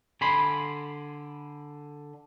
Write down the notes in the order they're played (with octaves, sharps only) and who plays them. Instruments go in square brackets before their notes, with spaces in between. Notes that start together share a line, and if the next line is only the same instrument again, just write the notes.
[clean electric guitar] D3 G#5 B5 C6